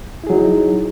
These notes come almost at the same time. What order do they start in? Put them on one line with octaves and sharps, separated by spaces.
E4 G#4 F#3 D#4